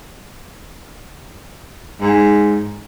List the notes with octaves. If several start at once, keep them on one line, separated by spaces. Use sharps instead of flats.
G#2